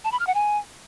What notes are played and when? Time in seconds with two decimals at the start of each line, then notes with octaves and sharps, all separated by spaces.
0.04 A5
0.12 B5
0.19 F6
0.27 F#5
0.35 G#5